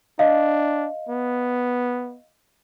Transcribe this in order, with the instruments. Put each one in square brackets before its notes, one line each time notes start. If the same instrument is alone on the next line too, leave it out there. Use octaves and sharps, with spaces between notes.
[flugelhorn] D4 [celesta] D#5 F5
[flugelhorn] B3